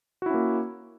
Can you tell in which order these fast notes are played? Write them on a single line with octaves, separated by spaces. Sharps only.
F#4 E4 C#4 A#3